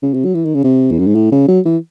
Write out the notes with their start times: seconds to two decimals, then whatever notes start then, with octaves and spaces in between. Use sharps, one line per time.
0.02 C#3
0.14 C3
0.25 F#3
0.35 E3
0.45 D#3
0.54 C#3
0.64 C3
0.91 E2
0.99 F#2
1.07 G#2
1.15 A2
1.32 C#3
1.48 F#3
1.65 E3